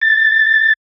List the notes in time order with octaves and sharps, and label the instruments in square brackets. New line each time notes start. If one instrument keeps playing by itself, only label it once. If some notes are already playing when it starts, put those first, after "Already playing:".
[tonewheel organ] A6